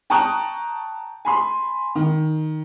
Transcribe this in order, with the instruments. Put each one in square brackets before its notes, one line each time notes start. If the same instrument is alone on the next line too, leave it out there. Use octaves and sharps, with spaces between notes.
[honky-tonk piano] G5 A5 A#5 C#6 D#6 F#6
G#5 B5 C6
D#3